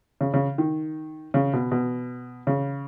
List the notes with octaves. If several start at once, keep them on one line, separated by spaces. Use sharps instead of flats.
C#3
C#3
D#3
C#3
B2
B2
C#3